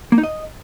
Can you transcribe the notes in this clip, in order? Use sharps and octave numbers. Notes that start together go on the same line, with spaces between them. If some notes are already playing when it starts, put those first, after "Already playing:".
A#3
D#4
D#5